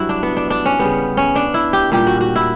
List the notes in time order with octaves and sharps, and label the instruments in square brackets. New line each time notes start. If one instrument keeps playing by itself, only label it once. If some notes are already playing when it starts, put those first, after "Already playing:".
Already playing: [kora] G2 F#3 E4 F#4
D4
B3
D4
D4
C#4
C#3 G3 B3
C#4
D4
E4
G4
A#2 G3 G4
F#4
F#4
E4